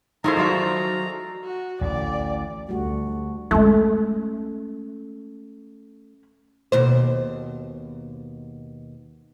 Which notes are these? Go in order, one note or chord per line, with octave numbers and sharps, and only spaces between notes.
D#3 F3 G#3 A3 D#4 E4 C5 A#5
F#3 F#4 D5 E5 F5 C#6
F#4
A1 D2 A2 D5
D2 G3 A3 F#4
G#3 A3 C#4
D#2 B2 C5